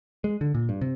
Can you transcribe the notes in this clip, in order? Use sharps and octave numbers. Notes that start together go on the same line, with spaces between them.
G#3
D3
A#2
G2
C3